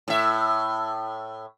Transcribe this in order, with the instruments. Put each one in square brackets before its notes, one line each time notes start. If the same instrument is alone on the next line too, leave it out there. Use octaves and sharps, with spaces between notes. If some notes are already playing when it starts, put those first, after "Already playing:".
[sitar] A2 E5